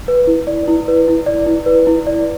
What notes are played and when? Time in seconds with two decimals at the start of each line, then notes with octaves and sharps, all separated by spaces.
0.08 B4
0.27 E4
0.47 D5
0.68 E4
0.88 B4
1.08 E4
1.26 D5
1.47 E4
1.66 B4
1.87 E4
2.07 D5